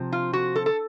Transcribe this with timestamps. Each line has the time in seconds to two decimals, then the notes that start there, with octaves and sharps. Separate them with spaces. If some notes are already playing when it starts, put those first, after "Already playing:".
Already playing: C3 F3 C4
0.12 F4
0.33 F#4
0.56 A4
0.66 A4